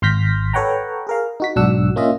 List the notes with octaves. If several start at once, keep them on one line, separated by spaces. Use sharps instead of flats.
G#1 C6 F6 G6 A#6 B6
A4 B4 C#5 F#5 G5 A#5
G#4 A#4 F5
D#4 F#4 B6
B1 G#2 D4 F#4 F#5 E6
A#3 C#4 F4 D#5 E5